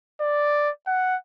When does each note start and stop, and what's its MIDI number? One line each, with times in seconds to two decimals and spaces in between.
0.21 0.70 74
0.87 1.16 78